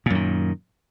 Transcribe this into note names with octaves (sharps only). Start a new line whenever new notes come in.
F#2 A#2 D#3